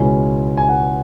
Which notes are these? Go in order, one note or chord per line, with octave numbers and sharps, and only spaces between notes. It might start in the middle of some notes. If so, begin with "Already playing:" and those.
Already playing: C#2 B2 G#3 C#4 E4 G#5
G#5
F#5